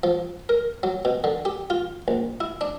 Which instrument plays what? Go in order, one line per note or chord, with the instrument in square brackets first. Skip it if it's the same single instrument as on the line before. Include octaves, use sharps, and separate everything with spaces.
[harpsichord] F3
A#4
F#3
B2
D3
G4
F4
A#1
E4
D4